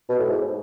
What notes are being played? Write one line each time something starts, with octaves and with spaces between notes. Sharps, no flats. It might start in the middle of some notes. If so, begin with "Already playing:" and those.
B2
A2
G#2